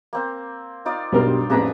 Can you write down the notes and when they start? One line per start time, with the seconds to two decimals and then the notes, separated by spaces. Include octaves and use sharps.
0.13 A#3 C4
0.85 D#4 F4 D5
1.12 B1 G2 G3 C4 A#4
1.50 A1 F2 A2 D4 G#4 B4 E5 A#5